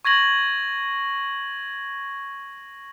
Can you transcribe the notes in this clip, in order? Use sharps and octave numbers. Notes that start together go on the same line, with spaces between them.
C#6 G#6 A#6 F#7